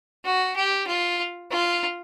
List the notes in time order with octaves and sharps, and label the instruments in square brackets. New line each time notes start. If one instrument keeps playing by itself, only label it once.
[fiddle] F#4
G4
F4
F4